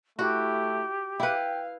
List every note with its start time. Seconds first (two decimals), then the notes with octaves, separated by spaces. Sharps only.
0.19 A3 E4 F#4 G4
1.20 E4 B4 F5 G5